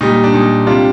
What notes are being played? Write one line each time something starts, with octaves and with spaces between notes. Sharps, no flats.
A#2 G3 D#4
D4
A#2 G3 D#4
C3 G3 D4 F4